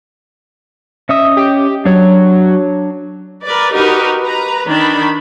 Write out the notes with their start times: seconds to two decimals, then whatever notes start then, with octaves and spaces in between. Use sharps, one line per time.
1.09 C#4 D#5 E5 D#6
1.37 G4
1.85 F#3 D4 C#5
3.45 A#4 B4 D5
3.74 D#4 F#4 G4 A#4 B4
4.23 B4 A#5
4.67 D#3 D4 B5